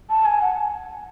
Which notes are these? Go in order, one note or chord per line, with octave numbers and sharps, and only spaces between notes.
A5
G#5
F#5